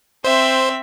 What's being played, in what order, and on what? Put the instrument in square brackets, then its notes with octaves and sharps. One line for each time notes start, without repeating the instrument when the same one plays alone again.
[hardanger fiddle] C4 E5 [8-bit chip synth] C5